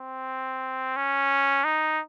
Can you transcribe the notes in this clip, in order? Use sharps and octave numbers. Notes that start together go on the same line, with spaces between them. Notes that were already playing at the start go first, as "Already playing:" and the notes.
Already playing: C4
C#4
D#4